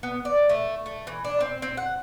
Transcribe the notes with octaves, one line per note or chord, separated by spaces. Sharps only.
B3
D5
A3
A3
E3
D4
C4
C4
F#5